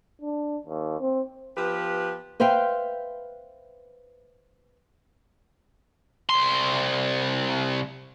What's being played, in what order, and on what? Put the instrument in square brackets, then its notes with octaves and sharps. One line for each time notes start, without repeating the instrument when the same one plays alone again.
[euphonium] D4
D#2
C4
[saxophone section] F3 B3 G4 B4
[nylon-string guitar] B4 C5 E5 F5 G5
[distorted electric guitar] C2 C6